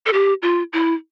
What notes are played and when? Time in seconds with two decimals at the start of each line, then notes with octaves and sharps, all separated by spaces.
0.06 A4
0.13 G4
0.42 F4
0.73 E4